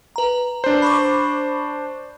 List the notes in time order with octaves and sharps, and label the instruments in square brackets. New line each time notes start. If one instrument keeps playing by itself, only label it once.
[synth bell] B4 A#5
[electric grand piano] D4 C5
[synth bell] B5 C#6 D6